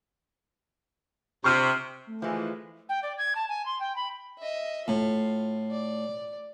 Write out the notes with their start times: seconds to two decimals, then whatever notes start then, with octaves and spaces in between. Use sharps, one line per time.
1.44 C3 C#6 F6 D#7
2.07 A3
2.22 E3 F3 G#3
2.89 G5
3.03 D5
3.18 G#6
3.35 A5
3.49 G#5
3.66 C6
3.80 G5
3.96 B5
4.39 D#5 E5
4.88 A2 F4
5.71 D5